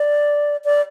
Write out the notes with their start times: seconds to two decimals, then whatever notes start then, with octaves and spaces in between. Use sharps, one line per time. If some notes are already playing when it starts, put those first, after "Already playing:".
Already playing: D5
0.65 D5